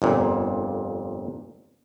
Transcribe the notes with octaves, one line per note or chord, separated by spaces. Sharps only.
G1 F2 A#2